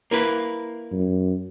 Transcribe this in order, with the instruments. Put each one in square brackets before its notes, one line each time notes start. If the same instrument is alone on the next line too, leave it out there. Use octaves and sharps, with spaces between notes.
[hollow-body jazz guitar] A#3 E4 B4
[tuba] F#2